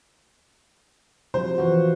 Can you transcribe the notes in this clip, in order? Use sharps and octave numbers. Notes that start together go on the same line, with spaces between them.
C3 F3 F#3 C5
E3 F3 F#4